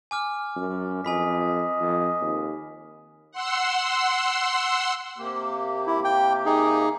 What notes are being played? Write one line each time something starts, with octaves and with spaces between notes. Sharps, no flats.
G#5 D6 F6
F#2
F2 D#5 G#5 B5 B6
F2
D#2
F#5 C6 E6
C3 A#3 G4
E4
G5
D#4 G#4